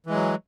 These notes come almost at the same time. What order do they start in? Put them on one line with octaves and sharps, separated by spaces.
E3 G#3 F#3